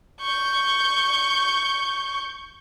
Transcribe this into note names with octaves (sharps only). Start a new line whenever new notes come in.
C#6 G6